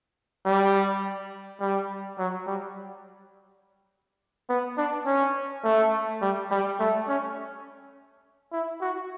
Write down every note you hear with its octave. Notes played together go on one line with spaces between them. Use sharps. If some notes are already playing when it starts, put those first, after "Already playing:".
G3
G3
F#3
G3
B3
D4
C#4
A3
G3
G3
A3
C#4
E4
F#4